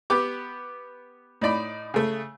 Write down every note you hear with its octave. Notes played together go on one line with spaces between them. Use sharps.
B3 G4 D6
A2 D#4 D5 B5
C#3 A3